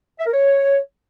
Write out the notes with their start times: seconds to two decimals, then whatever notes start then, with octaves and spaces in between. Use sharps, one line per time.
0.19 E5
0.26 A#4
0.33 C#5